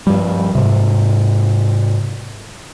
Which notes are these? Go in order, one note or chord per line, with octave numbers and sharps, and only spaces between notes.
G2 F3 G3
G#2 C3